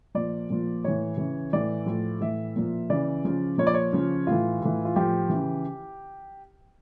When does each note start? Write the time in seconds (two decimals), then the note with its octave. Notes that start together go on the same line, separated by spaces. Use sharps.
0.15 A#2 F3 D5
0.50 A#2 F3
0.84 A2 E3 C#5
1.18 C#3 E3
1.53 A2 E3 D5
1.86 A2 F3
2.21 A2 E3 E5
2.56 A#2 F3
2.90 C#3 E3 D5
3.25 C#3 F3
3.58 A#2 F3 C#5
3.67 D5
3.74 C#5
3.93 C#3 F3
4.27 A2 E3 F4
4.61 A2 E3
4.85 F4
4.96 A2 F3 G4
5.29 C#3 E3